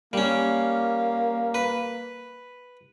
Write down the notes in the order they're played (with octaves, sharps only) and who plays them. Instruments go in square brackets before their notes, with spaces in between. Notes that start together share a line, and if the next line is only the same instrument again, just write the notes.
[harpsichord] G3 C#4 [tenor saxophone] A#3
[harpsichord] B4